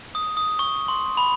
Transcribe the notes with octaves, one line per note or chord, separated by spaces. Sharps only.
D#6
D#6
C#6
C6
B5